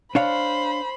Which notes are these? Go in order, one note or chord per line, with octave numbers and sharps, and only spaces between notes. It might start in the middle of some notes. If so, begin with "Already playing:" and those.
D4 C5 C#5 F5 B5